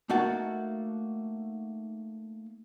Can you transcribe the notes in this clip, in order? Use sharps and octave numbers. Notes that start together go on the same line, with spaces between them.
A3 A#3 D#4 F#4 F#5 A5